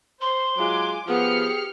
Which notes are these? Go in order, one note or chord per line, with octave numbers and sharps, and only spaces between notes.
C5 C6
F#3 G#3 F4 G#5 D6
F3 B3 G4 G#4 F6 C#7